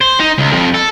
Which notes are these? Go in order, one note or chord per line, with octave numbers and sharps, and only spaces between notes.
C5
D#4
C#2
F2
A4